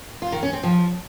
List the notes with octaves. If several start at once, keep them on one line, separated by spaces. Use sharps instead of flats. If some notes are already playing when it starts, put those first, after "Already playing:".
F4
D#3
C#4
C4
F3